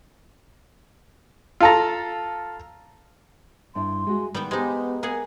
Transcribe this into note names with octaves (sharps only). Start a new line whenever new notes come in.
F4 A4 A#5
G2 D4 E4 C6
G#3 F#4 G#4
D#3 G3 B3 G5
G#3 B3 D#4 G4 B4 C5
A#3 G#4 F#5